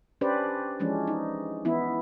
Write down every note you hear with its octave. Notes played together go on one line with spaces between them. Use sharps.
C#4 D4 G4 B4 C5 D5
E3 F3 G#3 C#4 D4
D#4
E3 B3 D4 E4